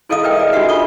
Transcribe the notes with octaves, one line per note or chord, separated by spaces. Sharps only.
E4 G#4 A4 D#5 F5 D#6
A#4 B4 D#5 E5 G5
G#4 D5 D#5
D4 F#4 G4 E5 F#5
F4 A4 C#6 D#6